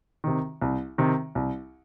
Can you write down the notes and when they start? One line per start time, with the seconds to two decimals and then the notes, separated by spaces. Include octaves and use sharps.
0.24 C3 D#3
0.62 C2
0.98 C3 D#3
1.35 C2